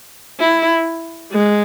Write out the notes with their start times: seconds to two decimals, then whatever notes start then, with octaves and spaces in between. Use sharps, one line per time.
0.40 E4
1.32 G#3